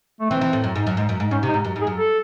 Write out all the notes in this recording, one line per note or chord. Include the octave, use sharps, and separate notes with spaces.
A3
E3 C4
E3
A2
F#2
G#2
F#2
G#2
F#2
G#2
G#2 C#4
C3
D#4
G#2
F#2
G#2
G#4
F#2
A4